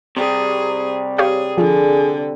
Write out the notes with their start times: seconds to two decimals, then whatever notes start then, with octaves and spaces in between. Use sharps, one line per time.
0.17 C3 G3 G#4
1.18 G4 G#4 C#5 F5
1.58 D3 F3 G#4